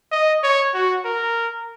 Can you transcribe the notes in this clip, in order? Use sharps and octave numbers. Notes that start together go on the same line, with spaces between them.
D#5
C#5
F#4
A#4